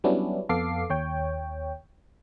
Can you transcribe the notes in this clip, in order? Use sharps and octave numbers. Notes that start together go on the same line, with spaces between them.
F#3 G3 B3 C#4 D4 E4
F2 B3 A4 F5 D6 C7
D#2 C#5 G5